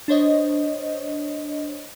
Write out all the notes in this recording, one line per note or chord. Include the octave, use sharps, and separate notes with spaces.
D4 C5 C#5 D#5